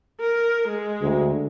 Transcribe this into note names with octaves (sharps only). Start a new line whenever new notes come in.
A#4
G#3
D2